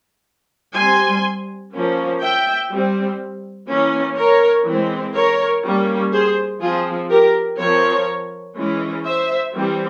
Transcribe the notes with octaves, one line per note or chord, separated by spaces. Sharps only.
G3 C4 G#5 C6
F3 A#3 C#4
E5 G5
G3 C4
E3 A#3 C#4
A#4 C#5
E3 G#3 C4
A#4 C#5
G3 A#3 C#4
G#4 C5
F3 C4 F4 G#4
G4 A#4
F3 C4 A#4 C#5
E3 G#3 C#4
C5 E5
E3 G3 C4